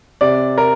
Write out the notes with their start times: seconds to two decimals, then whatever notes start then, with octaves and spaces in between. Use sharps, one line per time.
0.21 C3 D5
0.58 A#4